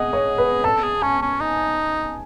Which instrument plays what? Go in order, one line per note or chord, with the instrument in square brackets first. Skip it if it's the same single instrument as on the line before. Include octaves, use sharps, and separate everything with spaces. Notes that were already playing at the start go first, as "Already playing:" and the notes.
Already playing: [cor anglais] G#4 [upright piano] D#5 F#5
[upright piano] C#5
B4
[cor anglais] A4 [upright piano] A5
[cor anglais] G#4
[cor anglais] C#4 [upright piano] G#5
[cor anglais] C#4
D#4